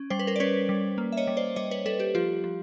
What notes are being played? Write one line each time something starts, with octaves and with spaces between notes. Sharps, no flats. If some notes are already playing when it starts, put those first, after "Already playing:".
Already playing: C#4
G3 C5
B4
A#4 C5
D5
C#4 B4 C#5
G3
A#3
E5
C#5 D#5
G3
C5 D5
G3 C#5 D#5
B4 C#5
G3 A4 B4
G4 A4
F3 F4 G4
F3